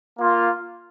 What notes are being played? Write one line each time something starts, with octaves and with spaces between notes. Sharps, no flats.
A#3 F4